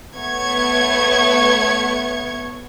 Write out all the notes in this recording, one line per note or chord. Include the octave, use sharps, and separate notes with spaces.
A3 B3 C#5 C#6 G#6